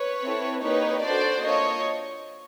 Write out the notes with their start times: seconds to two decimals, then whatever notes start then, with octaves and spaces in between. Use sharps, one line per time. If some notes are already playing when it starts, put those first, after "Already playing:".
Already playing: B4 C#5
0.22 C4 E4 A4
0.62 A#3 D#4 G4 B4 C#5
1.02 D4 F#4 A4 C5 D5
1.42 A#3 D4 F4 C#5 D#5